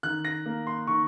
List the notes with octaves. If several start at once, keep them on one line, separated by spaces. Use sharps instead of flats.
D#3 F#6
A#6
A#3
C6
D#3 C#6